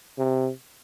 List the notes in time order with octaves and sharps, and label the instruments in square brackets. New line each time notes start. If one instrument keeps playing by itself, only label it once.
[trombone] C3